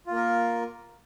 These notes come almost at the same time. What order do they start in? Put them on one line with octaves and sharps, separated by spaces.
F4 A#3 A#4